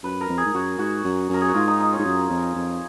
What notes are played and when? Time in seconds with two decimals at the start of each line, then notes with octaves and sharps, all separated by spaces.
0.04 F#2 B4
0.21 A#4
0.29 F2
0.38 G#4
0.46 G#2
0.54 F#2 F#4
0.79 G#2 F#4
1.04 F#2
1.30 F#2 A#4
1.41 G#4
1.48 F#4
1.54 G#2 F4
1.68 D#4
1.80 D#4
1.93 C#4
1.99 G#2
2.05 F#2
2.30 F2
2.55 F2